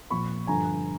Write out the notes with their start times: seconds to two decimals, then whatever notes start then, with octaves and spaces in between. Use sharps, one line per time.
0.10 A#2 F3 B5 C#6
0.47 G2 D3 F3 G#5 A#5